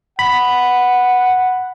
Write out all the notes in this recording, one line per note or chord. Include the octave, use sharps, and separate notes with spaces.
F#5 B5